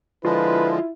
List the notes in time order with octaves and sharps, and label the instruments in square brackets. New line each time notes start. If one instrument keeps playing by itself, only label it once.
[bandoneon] D3 F3 G#3 [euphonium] E4 [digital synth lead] F4 [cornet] B4